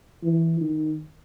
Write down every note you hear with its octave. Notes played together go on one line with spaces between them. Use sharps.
E3
D#3